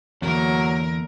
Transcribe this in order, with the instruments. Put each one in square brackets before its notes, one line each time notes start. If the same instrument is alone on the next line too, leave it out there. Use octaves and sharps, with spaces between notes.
[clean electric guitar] E2 [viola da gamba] D3 A#3 A#4 [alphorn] F#3